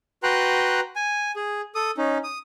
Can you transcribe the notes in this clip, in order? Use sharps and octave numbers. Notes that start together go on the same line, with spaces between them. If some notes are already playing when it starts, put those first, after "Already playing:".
F#4 B4 G5 A#5 C6 F#6
G#5
G#4
A4 D#6
C#4 D#4
D#6